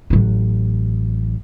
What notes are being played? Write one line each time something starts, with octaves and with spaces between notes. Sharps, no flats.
A1 F#3